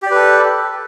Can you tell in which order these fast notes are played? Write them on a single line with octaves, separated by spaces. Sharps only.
G4 D5 B4 A4